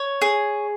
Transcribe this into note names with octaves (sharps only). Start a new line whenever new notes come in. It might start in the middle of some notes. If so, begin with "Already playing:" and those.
Already playing: C#5
G#4